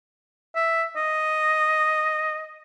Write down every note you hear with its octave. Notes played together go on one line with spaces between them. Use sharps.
E5
D#5